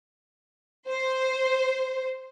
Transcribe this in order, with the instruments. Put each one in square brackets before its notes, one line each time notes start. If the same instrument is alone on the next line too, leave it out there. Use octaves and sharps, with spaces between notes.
[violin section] C5